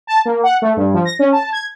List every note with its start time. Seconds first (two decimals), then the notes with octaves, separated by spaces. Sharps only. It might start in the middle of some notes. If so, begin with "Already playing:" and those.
0.07 A5
0.25 A#3
0.44 F#5
0.62 A3
0.77 G2
0.94 F3
1.05 A#6
1.19 C#4
1.33 A5
1.52 G#6